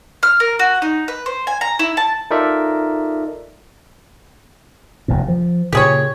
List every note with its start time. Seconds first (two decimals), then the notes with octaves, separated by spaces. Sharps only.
0.23 F6
0.40 A#4
0.59 F#4
0.82 D#4
1.08 B4
1.26 C5
1.47 G#5
1.61 A#5
1.79 E4
1.97 A5
2.31 D#4 F4 A4 A#4 D5 E5
5.08 F1 D#2 A#2
5.28 F3
5.72 A#2 C#3 G4 G#4 C#5